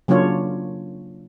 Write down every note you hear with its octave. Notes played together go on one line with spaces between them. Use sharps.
C#3 F#3 A#3 D4 F4 C#5